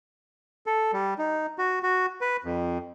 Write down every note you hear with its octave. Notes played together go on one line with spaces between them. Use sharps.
A4
G3
D#4
F#4
F#4
B4
F2